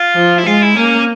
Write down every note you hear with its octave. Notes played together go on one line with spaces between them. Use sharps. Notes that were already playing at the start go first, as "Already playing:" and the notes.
Already playing: F4
F3
E4
G#3 F4
E4
A#3 C#4